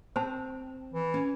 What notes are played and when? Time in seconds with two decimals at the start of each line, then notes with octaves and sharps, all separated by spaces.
0.16 C4 C5 A5
0.93 E3
1.14 C#4